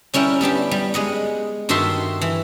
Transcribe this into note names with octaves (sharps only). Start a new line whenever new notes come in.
G3 C#4 E4 A#4 G5
G3 B3 D4 G4
G3
G#3 D#5 F#5
G2 D#3 F#4 A4 E5 C6
E3